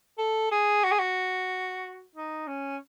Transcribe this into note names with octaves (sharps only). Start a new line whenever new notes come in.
A4
G#4
F#4
G#4
F#4
D#4
C#4